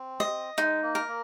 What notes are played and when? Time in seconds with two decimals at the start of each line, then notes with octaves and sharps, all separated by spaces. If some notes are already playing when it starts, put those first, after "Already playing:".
Already playing: C4
0.20 D#5
0.58 G#3 D#4
0.82 A#3
0.95 A#4
1.08 A#3